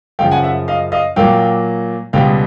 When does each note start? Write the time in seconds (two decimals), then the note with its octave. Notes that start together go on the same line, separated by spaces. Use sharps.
0.19 F#2 C#3 F3 F5 G5
0.31 F#5 G#5
0.43 E5 F#5
0.68 D#5 F5
0.92 D#5 F5
1.16 A#2 F#3 A#3 F5 G5
2.13 C#2 B2 G3 B3 F5 G5